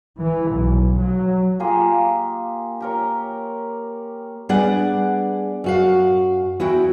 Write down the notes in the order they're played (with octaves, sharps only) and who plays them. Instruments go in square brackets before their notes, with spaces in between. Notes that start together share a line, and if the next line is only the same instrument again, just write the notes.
[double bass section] E3
B1
F#3
[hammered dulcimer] A#3 F4 G4 G#4
G4 A#4 C#5
[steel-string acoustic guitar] G3 B3 D4 G#4 D5 F#5
F#2 F#4 F5
E2 E4 F#4 G5